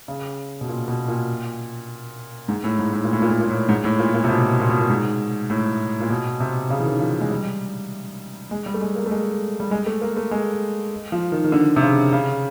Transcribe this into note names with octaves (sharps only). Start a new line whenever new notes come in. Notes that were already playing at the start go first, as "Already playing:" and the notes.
C#3
B2
A#2
B2
A#2
G#2
A2
G#2
A2
A#2
A2
A#2
A2
A#2
A2
G#2
A2
A#2
A#2
C3
B2
A#2
B2
A#2
G#2
A2
A#2
B2
C3
C#3
E3
D#3
F3
G#3
G3
G#3
G3
A3
G#3
A#3
A3
G#3
G3
G#3
A3
A#3
A3
G#3
F3
D#3
D#3
D3
C3
C#3
C#3